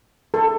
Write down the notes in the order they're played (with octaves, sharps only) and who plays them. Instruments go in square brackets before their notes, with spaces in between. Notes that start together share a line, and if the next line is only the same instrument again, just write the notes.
[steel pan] A4